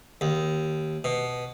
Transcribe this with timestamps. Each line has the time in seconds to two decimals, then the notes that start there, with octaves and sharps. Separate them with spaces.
0.21 D#2
1.04 B2